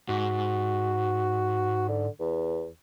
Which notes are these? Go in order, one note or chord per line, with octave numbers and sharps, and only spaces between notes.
G#2 F#4
D3
E2